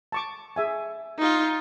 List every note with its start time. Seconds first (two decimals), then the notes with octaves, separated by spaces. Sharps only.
0.12 A5 C#6 D6
0.56 G#4 E5 G#5
1.19 D#4 F4